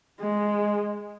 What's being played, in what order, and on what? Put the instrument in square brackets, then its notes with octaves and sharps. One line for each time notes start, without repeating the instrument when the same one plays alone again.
[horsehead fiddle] G#3